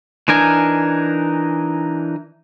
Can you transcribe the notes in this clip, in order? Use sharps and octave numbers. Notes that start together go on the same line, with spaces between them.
E3 D4 D#4 A#4 G#5